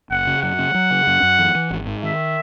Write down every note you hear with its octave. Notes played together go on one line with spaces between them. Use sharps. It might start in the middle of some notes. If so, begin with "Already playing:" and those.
F#1 F#5
C#3
F#2 F#5
C#3
F#3
C#3
F#2
F#2
E3
E3
G#1
G#2
D#3 E5